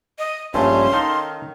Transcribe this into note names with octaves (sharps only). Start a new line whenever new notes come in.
D#5
A#1 G2 A3 C#4 C6
D#3 D#4 A4 F5